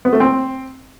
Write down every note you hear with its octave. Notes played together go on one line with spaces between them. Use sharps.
B3
A3
C4